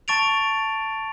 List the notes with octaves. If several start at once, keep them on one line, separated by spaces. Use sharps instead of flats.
A5 C#6 A6 D7 F7